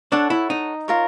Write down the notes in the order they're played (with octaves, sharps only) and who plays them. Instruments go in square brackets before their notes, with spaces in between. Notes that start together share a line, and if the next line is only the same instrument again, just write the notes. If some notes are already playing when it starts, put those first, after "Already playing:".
[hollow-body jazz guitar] D4 [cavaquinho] A4 C#5 F#5 A5
[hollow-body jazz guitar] E4
D#4
[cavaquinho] F4 A#4 C#5